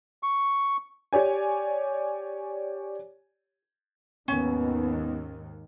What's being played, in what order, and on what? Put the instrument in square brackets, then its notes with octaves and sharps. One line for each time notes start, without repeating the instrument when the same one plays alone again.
[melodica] C#6
[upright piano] G4 C#5 D5 G#5
[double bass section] D#2 G#2 D#3 [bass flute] B3 [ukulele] C#4